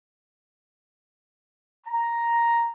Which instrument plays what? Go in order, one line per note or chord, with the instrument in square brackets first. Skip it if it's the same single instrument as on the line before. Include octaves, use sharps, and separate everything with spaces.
[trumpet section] A#5